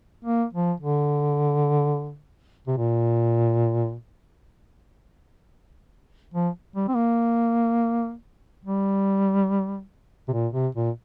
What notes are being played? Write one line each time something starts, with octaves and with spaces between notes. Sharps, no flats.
A#3
F3
D3
C3
A#2
F3
G3
C4
A#3
G3
C3
A#2
C3
A#2